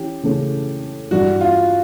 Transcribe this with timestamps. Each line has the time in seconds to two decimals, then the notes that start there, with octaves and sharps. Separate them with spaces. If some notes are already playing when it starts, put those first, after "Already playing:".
Already playing: E3 C#4 G4
0.23 C#3 E3 A3 C#4
1.11 G2 E3 G3 F#4
1.41 F4